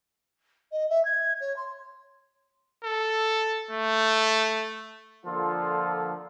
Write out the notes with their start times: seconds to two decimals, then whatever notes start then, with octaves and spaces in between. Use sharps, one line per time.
0.72 D#5
0.90 E5
1.05 G#6
1.40 C#5
1.56 C6
2.84 A4
3.71 A3
5.25 D3 F3 A#3 F4 A4